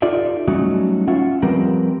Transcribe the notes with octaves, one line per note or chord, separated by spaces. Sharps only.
D#4 F4 G4 A4 D5 E5
F#3 G3 A3 C#4 D#4 F#4
C#4 F4 E5 F#5
F3 G3 C4 G4 A#4 B4